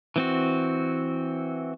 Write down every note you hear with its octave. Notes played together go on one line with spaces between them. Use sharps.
E3 C4 F#4